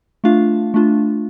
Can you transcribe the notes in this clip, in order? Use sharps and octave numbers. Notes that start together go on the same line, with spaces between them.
A3 D4 F4 F5
A3 D4 F4